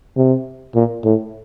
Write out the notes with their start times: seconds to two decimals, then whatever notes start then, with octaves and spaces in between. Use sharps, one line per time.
0.16 C3
0.75 A#2
1.04 A2